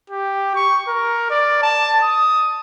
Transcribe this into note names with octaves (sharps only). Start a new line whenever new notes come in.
G4
C#6
A#4
D5
A5
D#6